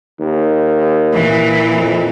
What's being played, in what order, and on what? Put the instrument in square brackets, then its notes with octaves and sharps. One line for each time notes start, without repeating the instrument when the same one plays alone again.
[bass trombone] D#2
[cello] A#2 E3
[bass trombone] F2